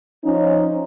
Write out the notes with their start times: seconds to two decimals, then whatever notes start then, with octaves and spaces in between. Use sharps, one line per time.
0.25 F3 C#4 D#4